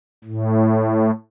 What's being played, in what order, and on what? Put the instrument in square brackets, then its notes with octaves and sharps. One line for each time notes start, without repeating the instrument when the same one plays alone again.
[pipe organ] A2